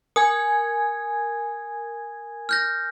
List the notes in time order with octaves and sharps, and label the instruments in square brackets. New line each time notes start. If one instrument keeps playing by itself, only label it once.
[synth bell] A#4 G#5 G#6 [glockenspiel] D#6
[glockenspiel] F6 G6 A#6